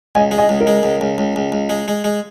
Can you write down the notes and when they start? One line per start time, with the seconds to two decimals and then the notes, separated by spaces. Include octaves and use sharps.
0.15 C#2 D#5 G#5
0.31 G#3
0.38 D#5 G#5
0.49 C#2
0.60 A#4 D#5
0.67 G#3
0.83 C#2
1.01 C#2
1.18 C#2
1.36 C#2
1.52 C#2
1.69 G#3
1.88 G#3
2.04 G#3